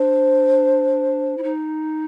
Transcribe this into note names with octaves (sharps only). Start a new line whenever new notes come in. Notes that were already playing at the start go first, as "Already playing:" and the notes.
Already playing: D4 C5
E4
D#4